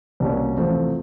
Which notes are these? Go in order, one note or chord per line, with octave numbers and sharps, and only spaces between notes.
C2 B2 G3 A#3 C#4
E2 C3 F3 A3 C4